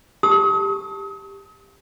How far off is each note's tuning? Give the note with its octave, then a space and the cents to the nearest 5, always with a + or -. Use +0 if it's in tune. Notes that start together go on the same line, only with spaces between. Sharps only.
G4 +15 A5 +0 D#6 +45